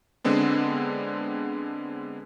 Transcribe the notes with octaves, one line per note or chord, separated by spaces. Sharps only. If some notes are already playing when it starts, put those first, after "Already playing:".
D3 G#3 B3 C4 D4